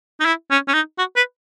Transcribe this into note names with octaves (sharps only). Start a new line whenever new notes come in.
D#4
E4
C#4
C#4
D#4
F#4
B4